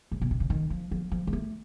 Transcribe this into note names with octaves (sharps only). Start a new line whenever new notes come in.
A2
A#2
C3
C#3
D#3
F3
F3
F3
F#3
A3